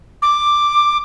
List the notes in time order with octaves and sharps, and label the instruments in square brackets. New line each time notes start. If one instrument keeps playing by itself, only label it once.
[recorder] D6